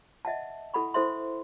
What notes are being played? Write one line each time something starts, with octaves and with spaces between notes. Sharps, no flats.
D#5 E5 F#5 A5
E4 A4 F#5 B5 C#6
E4 A4 C5 E5 C6